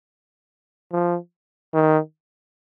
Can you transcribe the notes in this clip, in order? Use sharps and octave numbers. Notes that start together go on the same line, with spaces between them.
F3
D#3